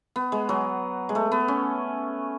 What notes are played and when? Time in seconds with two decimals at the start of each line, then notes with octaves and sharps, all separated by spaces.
0.16 B3
0.32 G#3
0.49 F#3
1.09 G#3
1.15 A3
1.32 B3
1.48 C#4